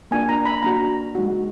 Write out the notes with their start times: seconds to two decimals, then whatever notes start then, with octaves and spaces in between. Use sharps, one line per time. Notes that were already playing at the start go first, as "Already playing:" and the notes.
0.11 A#3 D4 F4 G#5
0.29 A#5
0.45 B5
0.63 A#3 D4 F#4 A#5
1.15 G#3 D#4 F#4